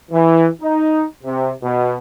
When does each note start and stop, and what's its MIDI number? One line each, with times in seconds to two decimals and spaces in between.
0.12 0.47 52
0.62 1.04 63
1.24 1.51 48
1.63 1.97 47